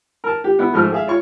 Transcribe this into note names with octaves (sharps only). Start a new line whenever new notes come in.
A#4 A5
G4
B3 E4
G#2 F3 A3 A4 F6
G#4 E5 F5
F4 C#5 C#6